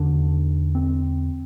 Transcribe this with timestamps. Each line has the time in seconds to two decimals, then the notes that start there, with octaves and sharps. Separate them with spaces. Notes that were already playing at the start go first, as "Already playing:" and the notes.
Already playing: E2 D3 D4
0.75 C4